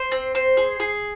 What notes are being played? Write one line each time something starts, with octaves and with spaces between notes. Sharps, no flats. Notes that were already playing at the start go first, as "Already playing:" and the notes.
Already playing: C5
C4
C5
G#4
G#4